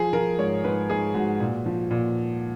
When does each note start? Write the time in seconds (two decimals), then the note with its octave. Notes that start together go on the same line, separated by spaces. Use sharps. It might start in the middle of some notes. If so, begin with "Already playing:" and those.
Already playing: F3 G#4
0.13 F3 A#4
0.38 G#2 C#5
0.64 G#2 B4
0.89 G#2 G#4
1.14 G#2 F#4
1.40 A#2
1.66 F3
1.91 A#2